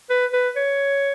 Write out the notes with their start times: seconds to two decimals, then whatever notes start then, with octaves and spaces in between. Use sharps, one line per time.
0.10 B4
0.33 B4
0.56 C#5